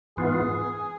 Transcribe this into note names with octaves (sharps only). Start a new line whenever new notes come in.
G#2 E3 B3 F4 G#4